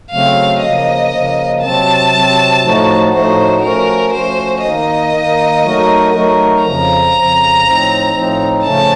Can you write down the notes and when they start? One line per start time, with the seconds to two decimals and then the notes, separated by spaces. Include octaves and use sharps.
0.11 C#3 F#3 A3 C4 F5
0.61 C#3 F3 A#3 D#5
1.11 C#3 F3 A#3
1.62 C3 F#3 C4 A5
2.13 C3 F#3 C4
2.63 A2 F3 A3 D#4 F#4
3.13 A2 F3 A3 D#4 F#4 C5
3.62 F3 A3 C#4 F#4 A#4
4.12 F3 A3 C#4 F#4 C5
4.63 D#3 A#3 D#4 D#5
5.13 D#3 A#3 D#4
5.64 F#3 A3 D#4 F#4 A#4
6.13 F#3 A3 D#4 F#4 A#4
6.64 F2 C#3 F3 A#5
7.14 F2 C#3 F3
7.64 A2 F3 C4 D#4
8.14 A2 F3 C4 D#4
8.64 C#3 F3 A3 C#4 A5